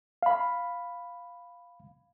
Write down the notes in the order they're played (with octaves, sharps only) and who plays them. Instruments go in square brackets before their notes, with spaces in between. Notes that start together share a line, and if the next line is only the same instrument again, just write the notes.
[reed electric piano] F5 B5